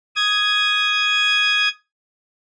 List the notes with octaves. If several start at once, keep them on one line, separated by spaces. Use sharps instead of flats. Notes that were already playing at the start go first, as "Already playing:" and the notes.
D#6 G#6